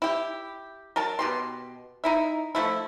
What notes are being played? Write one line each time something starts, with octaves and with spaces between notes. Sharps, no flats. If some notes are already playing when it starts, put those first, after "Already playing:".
E4 G4
F#3 A#4 A5
B2 G4 C6
D#4 E4 E5
F3 A3 E4